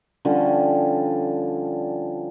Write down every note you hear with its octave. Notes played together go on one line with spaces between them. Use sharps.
D3 F3 G3 C#4